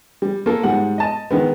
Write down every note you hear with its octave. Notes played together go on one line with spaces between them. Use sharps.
G3
A#3 F4 A4
G#2 G3 F#5
D#5 A5
D#3 G#3 B3